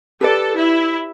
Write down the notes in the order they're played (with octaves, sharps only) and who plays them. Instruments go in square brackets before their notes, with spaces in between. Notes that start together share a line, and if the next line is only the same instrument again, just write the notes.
[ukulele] G4 B4 D5 [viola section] A4
[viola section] E4